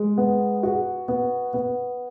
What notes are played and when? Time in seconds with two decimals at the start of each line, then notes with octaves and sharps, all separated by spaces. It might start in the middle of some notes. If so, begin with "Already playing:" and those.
Already playing: G#3
0.18 B3
0.63 F#4
1.08 B3
1.54 B3